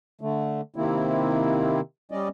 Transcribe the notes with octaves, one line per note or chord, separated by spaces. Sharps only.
D3 A3
C3 D#3 A#3 C4 E4
G3 C#4 D5 D#5